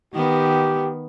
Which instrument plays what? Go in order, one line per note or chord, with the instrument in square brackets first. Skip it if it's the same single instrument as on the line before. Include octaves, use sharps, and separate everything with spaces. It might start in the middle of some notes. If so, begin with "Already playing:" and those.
[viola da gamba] D#3 B3 [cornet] G4